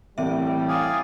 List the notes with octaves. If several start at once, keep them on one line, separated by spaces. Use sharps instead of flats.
A2 E3 G3 C4 E5 G5
D5 F5 G#5 D#6